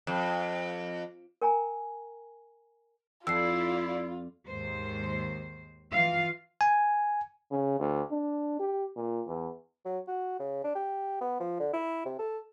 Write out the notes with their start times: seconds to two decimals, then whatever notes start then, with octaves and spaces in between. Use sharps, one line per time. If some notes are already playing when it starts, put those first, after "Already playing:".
0.07 F2
1.42 A#4 G5 G#5 A#5
3.27 F2 E4 F4 D5 E6 C7
4.48 D#2 G#2 D#3 C5
5.92 E3 F4 F5
6.61 G#5
7.51 C#3
7.80 D2
8.11 D4
8.59 G4
8.96 A#2
9.27 E2
9.85 F#3
10.08 F#4
10.40 C#3
10.64 D4
10.75 G4
11.21 B3
11.40 F3
11.60 D3
11.74 E4
12.05 C3
12.19 A4